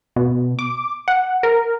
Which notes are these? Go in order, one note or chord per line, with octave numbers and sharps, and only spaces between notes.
B2
D6
F#5
A#4